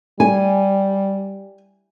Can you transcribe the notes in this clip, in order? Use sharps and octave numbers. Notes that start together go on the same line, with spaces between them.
G3 G#5